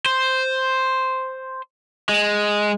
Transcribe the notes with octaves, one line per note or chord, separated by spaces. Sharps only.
C5
G#3